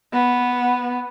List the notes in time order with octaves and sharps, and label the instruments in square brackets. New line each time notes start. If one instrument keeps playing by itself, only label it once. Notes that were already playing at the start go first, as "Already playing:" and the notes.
[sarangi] B3